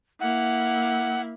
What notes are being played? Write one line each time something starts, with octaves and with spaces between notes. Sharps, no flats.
A#3 E4 F#5